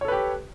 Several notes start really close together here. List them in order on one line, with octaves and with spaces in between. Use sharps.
C#5 A4 B4 G4